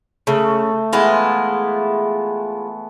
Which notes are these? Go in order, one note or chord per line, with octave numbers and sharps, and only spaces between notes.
C#3 A3
E3 G#3 B3 E4 F4